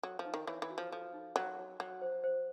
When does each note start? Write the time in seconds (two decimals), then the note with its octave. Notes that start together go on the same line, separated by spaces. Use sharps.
0.03 F#3 A4
0.19 F3
0.25 D#4
0.34 D#3
0.47 E3 C#5
0.62 E3
0.70 F#4
0.78 F3
0.92 F3 A4
1.14 D#4
1.36 F#3 C#5
1.58 F#4
1.80 F#3 F#5
2.02 C5
2.24 C5